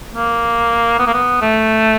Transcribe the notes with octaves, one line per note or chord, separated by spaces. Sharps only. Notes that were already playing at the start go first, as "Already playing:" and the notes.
A#3
B3
A#3
B3
A3